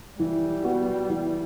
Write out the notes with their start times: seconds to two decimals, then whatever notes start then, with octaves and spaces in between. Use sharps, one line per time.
0.18 E3 G3
0.64 B3 F#4
1.10 E3